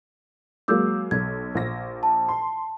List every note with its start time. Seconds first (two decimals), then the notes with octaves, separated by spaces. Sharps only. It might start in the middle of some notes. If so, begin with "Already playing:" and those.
0.68 F#3 G#3 A#3 D6 E6 G6
1.11 B1 G#6
1.55 A#1 A#6
2.03 A5
2.28 C6